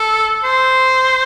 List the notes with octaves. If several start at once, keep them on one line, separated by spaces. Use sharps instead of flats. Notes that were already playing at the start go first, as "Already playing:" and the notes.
Already playing: A4
C5